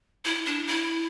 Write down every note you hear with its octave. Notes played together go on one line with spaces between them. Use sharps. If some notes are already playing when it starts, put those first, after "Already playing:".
E4
D4
E4